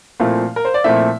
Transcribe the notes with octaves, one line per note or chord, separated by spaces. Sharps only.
A#2 F3 A3 C4 E4 F5
A#4
C5
D5
A#2 F3 A3 C4 E4 E5